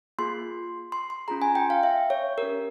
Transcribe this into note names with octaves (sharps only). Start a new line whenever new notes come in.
A#3 F4 G#4 C6
C6
C6
C#4 F4 G#4 A#5
G#5
G5
F5
E5
C#5
C#4 G4 A#4